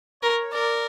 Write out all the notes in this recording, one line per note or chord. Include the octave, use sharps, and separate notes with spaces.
A#4 C#5
A#4 D5